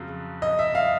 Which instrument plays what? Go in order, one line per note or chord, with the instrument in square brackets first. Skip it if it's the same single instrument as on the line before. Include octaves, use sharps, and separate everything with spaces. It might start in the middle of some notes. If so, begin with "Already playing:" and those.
Already playing: [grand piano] F2 C#3 F#3
D#5
E5
F5